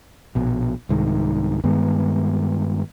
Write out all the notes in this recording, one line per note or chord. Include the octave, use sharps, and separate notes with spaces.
A#1 B2
C2 G#2 D#3
G2 D#3 G#3 B3